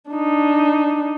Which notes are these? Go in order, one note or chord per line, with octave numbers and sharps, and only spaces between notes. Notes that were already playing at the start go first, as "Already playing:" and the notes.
D4 D#4